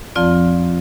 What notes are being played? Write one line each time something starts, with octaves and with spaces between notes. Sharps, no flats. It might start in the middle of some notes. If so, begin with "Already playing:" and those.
F2 F3 C4 F4 D5